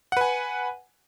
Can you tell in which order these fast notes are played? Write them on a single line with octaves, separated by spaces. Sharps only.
F#5 B4 G#5